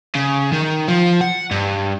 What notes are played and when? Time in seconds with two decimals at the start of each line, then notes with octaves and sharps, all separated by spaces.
0.15 C#3
0.53 D#3
0.88 F3
1.21 F#5
1.51 G2